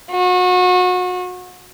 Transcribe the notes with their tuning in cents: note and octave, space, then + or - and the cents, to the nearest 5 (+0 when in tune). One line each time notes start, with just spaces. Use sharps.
F#4 -30